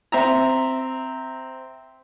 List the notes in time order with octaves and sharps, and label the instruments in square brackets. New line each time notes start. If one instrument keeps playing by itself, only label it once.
[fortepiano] C4 E5 A#5